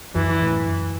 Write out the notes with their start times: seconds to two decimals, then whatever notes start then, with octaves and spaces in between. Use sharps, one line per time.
0.15 F#2 E3
0.42 A2